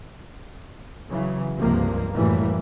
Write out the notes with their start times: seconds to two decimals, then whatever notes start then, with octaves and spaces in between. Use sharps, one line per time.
1.09 C#3 E3 F#3
1.58 C#2 G2 C3 F3 A#3
2.13 F#2 A2 E3 G3 A#3